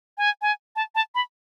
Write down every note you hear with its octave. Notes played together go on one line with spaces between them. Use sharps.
G#5
G#5
A5
A5
B5